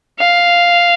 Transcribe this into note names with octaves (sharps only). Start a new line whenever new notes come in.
F5